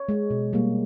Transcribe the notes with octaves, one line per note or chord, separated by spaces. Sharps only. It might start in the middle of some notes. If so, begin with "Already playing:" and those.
Already playing: C#5
G#3
B2
G3 A#3